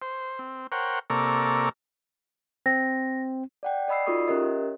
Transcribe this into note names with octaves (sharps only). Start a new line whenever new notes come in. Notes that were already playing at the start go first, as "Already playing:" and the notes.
C5
C4
A#4 C5 C#5 F#5 G5
C3 A#3 A4 D5 A#5 C#6
C4 A#6
D5 F#5 G5
D5 D#5 B5 E6 C7
D#4 F4 F#4 A4 C#6 D#6
C#4 G4 A#4 C#5 D#5 E5